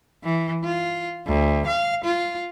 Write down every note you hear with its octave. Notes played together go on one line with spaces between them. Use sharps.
E3
F4
D2
F5
F4